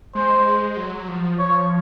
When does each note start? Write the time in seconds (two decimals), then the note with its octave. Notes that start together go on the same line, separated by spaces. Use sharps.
0.15 G#3 C5
0.77 F#3
1.08 F3
1.39 F3 C#5